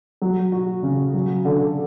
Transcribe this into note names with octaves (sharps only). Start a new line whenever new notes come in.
F#3
F#4
C#3
F#3
D3